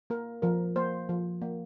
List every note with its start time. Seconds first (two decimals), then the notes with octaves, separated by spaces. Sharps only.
0.10 A#3 A#4
0.42 F3 A#4
0.76 A#3 C5
1.09 F3
1.42 A#3